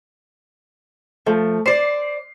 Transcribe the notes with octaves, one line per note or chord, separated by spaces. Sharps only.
F3 A3
C5 D5 C7